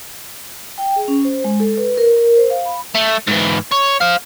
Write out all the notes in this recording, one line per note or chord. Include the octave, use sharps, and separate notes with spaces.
G5
G#4
C#4
C5
G#3
A4
B4
A#4
A#4
C5
F5
B5
A3
G#2 E3
C#5
C5 F5